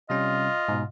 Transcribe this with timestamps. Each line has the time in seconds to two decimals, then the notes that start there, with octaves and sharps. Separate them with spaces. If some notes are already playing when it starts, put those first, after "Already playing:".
0.10 C3 G3 C#4 F4 D#5
0.68 G#2 B2